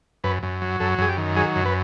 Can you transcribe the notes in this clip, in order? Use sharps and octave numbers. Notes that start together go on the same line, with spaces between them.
F#2 B4
F#2
F#3
F#2 A4
F#2 G#4
G4
D#3
F#3 G#4
F#2
B4